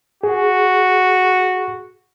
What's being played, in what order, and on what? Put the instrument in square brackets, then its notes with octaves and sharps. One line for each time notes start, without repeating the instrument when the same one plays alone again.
[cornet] F#4 [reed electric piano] G#4